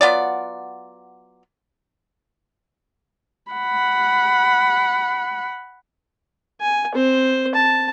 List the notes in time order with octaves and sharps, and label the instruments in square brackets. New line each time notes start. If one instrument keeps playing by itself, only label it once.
[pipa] F#3 B3 F4 D5
[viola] F#5 B5
[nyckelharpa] G#5
C4 C5
A5